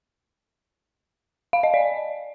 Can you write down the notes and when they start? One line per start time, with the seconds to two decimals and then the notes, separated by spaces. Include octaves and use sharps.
1.53 F5
1.63 D#5
1.74 D5